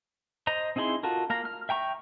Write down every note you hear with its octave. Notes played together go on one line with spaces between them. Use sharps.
C5 D#5 A#5
C4 D#4 E4 G#4 C6
F4 F#4 A4 A#4
A#3 F5 A#5
F6
E5 G5 A#5 C#6